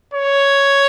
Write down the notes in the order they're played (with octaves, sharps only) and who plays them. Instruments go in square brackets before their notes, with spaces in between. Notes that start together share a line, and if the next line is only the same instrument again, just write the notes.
[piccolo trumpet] C#5